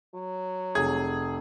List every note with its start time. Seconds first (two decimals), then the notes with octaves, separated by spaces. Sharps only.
0.15 F#3
0.75 F1 G#4 G#6